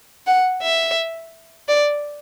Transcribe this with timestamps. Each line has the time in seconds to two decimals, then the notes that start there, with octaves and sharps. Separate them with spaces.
0.27 F#5
0.62 E5
1.68 D5